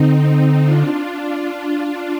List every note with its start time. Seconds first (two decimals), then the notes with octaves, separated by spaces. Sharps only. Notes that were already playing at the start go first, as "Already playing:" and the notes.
Already playing: D3 C4 D#4
0.65 D4 F4